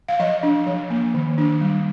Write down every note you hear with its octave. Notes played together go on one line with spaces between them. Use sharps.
F5
F3 D#5
D4
F3
A#3
D#3
D4
G3